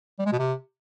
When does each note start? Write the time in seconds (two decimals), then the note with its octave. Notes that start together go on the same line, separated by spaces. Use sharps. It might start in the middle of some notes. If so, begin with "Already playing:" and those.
0.19 G3
0.26 G#3
0.32 B2
0.39 C3